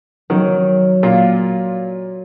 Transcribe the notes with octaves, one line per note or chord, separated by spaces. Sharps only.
D#3 F#3
A#2 F4